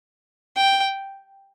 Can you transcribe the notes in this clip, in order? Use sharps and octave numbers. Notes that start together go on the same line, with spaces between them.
G5